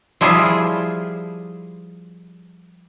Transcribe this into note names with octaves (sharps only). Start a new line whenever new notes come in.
F3 G3 E4 F4 G#4